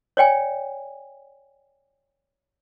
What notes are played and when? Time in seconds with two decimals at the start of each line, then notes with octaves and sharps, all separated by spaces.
0.17 C#5 D5 G5 G#5